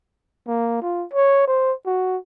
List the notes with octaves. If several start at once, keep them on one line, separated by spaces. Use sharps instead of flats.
A#3
F4
C#5
C5
F#4